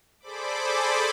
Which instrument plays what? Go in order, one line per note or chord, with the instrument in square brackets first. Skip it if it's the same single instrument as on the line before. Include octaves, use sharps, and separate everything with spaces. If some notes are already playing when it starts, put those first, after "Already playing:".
[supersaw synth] G#4 A4 C5 D5 B5 D6